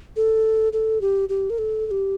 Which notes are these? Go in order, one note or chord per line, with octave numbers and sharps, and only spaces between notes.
A4
A4
G4
G4
A#4
A4
A4
G4